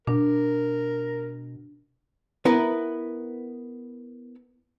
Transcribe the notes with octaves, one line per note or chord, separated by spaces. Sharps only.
B2 D4 A#4
B3 E4 A#4 B4